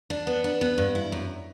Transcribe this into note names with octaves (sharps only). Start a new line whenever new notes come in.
D4
B3
D4
B3
G2
E4
F#2